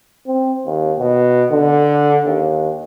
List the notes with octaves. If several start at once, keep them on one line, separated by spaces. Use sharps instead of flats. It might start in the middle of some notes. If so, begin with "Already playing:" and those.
C4
D#2
B2
D3
D#2